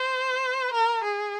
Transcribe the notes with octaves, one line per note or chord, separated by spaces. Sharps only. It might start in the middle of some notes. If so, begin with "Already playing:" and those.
Already playing: C5
A#4
G#4